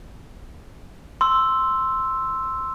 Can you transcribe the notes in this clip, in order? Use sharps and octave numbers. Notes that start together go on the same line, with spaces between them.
C6 E6